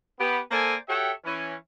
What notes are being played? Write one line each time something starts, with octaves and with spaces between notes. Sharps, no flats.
B3 G4
A#3 A4 C5 D5 G#5
F#4 G4 A4 C#5 E5 G5
E3 C#4